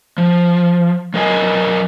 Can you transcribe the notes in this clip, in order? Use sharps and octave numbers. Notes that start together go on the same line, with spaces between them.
F3
F#3 A#4 D#5 G#5